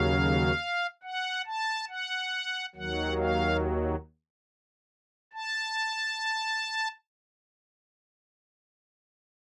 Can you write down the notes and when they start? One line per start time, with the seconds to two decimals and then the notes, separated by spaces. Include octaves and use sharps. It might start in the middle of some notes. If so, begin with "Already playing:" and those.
Already playing: D#2 C#3 F#3 F5
1.03 F#5
1.46 A5
1.89 F#5
2.75 D#2 D#3 F#3 F#5
3.18 F5
5.33 A5